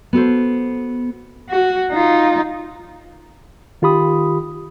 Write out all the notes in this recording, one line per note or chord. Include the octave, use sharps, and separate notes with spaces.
B3 F#4 A4 C5
F#4
D#4 F4
D#3 F4 G4 B5 D#6